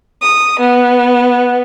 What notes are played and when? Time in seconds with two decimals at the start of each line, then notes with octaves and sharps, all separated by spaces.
0.23 D#6
0.60 B3